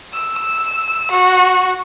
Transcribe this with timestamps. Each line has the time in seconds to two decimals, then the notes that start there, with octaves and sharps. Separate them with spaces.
0.13 E6
1.10 F#4